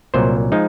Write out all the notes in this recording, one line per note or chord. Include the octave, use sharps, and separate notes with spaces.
C2 A#2 F#3 C5
F3 G#3 D#4